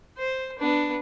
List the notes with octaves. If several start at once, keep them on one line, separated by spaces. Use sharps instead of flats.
C5
B3 D4